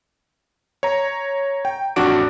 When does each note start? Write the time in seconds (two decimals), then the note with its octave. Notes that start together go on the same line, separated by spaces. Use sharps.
0.83 C#5 A#5
1.65 G5
1.96 A1 F2 D4 F#4 D6 D7